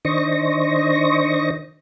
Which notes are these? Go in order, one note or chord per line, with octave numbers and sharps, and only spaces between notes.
D#3 D4 C5 D#5 C#6 A#6